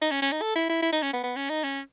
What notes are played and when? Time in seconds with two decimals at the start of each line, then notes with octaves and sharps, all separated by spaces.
0.02 D#4
0.11 C#4
0.22 C#4
0.32 D#4
0.42 A4
0.56 E4
0.70 E4
0.83 E4
0.92 D#4
1.03 C#4
1.14 B3
1.24 B3
1.36 C#4
1.50 D#4
1.64 C#4